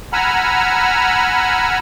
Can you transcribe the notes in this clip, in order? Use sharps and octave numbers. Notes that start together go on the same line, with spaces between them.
F#5 G#5 A#5 B5 E6 F6